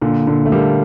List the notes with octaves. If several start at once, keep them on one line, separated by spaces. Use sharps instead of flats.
A#2 D3
A#2 D3
A3
G3 A#3